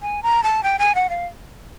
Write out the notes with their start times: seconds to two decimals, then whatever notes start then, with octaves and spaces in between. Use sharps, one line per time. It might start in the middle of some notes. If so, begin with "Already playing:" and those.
0.02 G#5
0.23 A#5
0.43 A5
0.63 G5
0.79 G#5
0.95 F#5
1.10 F5